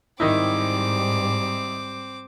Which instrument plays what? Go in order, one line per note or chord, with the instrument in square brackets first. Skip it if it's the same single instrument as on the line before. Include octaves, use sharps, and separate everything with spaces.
[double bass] G#2 G3 [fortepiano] D#3 D#4 E4 [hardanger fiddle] C4 D6